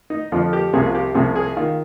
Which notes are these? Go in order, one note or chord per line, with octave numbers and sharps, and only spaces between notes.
D#4
F2 D3 F3 F4
G4
C2 C3 F3 G#4
F4
G4
C2 C3 F3 G#4
G#4
D#3 F4